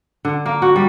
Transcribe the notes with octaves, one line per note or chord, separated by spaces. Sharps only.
D3
A#3
F#4
G3